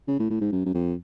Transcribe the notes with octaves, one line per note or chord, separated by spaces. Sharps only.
C#3
A2
A2
G#2
F#2
F#2
F2